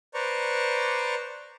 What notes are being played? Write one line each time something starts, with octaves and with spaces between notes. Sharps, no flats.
B4 C5 D5 A#5 C#6